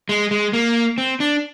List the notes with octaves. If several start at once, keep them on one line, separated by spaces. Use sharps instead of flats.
G#3
G#3
A#3
C4
D4